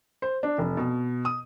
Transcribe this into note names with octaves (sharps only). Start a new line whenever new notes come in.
C5
D4
F1
B2
D#6